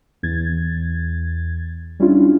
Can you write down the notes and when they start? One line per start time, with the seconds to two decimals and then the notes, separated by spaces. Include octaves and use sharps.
0.23 E2 G#6 A6
1.99 G3 C#4 D4 E4 F4